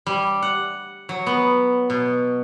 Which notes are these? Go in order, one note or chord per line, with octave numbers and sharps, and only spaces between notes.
G3
F#5
F#3
B3
B2